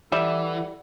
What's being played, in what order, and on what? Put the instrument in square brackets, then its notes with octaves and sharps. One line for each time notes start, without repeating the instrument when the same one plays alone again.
[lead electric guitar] E3 [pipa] G3 [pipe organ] E4 A4 F#5 [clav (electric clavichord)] E5